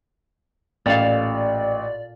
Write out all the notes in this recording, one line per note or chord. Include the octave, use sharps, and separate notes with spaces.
A1 A#2 A4 D5 F5